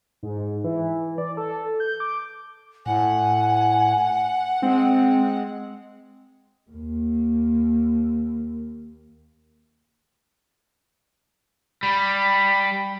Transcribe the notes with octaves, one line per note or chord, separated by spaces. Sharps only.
G#2
E3
D5
A4
G6
D6
A2 F#5 G#5
G#3 C4
D#2 A#3
G3 B5